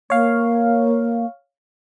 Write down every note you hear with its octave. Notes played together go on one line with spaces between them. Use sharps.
A#3 C#5 F5